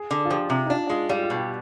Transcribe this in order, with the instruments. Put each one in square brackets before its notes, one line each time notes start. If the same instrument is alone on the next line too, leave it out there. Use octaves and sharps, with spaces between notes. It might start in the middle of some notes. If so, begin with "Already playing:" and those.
Already playing: [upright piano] G#4
[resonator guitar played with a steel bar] D3
[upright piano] F4
[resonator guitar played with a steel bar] F3 [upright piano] G4
[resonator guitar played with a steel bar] C3
[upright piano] D#4
[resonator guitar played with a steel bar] D4 [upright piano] F4
[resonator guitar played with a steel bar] G#3 [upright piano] F4
[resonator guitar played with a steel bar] G3 [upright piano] F4
[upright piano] F4
[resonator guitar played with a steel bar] B2
[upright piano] G4